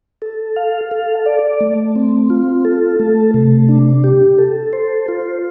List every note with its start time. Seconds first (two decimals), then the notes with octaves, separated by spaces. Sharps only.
0.22 A4
0.56 F5
0.91 A4
1.26 D5
1.60 A3
1.96 C4
2.30 F4
2.65 A4
3.00 A3
3.34 C3
3.69 D4
4.04 G4
4.38 A4
4.73 C5
5.08 F4